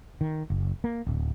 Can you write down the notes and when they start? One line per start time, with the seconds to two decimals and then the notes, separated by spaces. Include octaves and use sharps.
0.21 D#3
0.50 F#1
0.84 A#3
1.07 D1